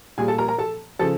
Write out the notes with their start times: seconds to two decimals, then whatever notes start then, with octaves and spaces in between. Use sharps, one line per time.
0.18 A#2 G3 G#4 G#5
0.28 A4 A5
0.38 A#4 A#5
0.48 A#4 A#5
0.58 A4 A5
0.99 C#3 F3 A4 A5